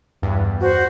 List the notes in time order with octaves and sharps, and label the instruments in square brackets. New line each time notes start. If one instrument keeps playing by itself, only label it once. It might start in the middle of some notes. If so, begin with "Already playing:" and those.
[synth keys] E2 G2
[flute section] F#4 C5